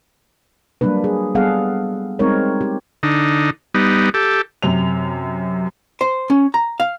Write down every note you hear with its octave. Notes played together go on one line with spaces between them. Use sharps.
F#3 G3 A#3 D4 B4
G#4
G3 B3 G#4 A4 F5 F#5
G3 G#3 C4 D#4 A#4 C#5
G4
D3 D#4
G3 B3 D#4
G4 A4
F#2 C3 F7
C5
C#4
A#5
F5